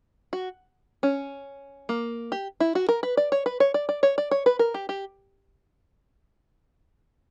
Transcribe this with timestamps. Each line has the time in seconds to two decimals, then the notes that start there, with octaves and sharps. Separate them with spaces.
0.33 F#4
1.03 C#4
1.89 A#3
2.32 G4
2.60 E4
2.75 F#4
2.89 A#4
3.03 B4
3.17 D5
3.32 C#5
3.46 B4
3.60 C#5
3.74 D5
3.89 D5
4.03 C#5
4.18 D5
4.31 C#5
4.46 B4
4.59 A#4
4.74 G4
4.89 G4